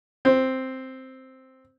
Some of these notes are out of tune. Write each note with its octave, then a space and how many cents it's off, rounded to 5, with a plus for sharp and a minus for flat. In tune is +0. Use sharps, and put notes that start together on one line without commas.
C4 +0